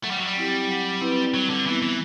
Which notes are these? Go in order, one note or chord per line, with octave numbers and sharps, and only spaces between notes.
F#3 A3
G3
F#3
G3
C4 E4 G4
F#3
C4 E4 B4
F#3 G3
D3
E3 B3 E4
E3